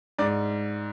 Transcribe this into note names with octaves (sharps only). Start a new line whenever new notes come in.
G#2 D5